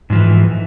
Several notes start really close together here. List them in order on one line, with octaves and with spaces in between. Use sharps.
G#2 F3 E3